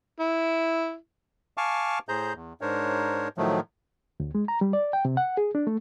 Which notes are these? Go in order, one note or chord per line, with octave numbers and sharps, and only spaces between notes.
E4
F5 G#5 A5 C#6 D6 F6
A2 G#4 C5 A#5 G6
E2
G#2 D4 A#4 C5 C#5
A2 D#3 F3 F#3 A3
D2
G#3
A#5
G3
D5
G5
C3
F#5
G#4
D4
A3